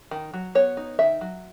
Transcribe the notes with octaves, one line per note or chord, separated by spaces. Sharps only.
D#3
F#3
B3 C#5
D#4
D#3 E5
F#3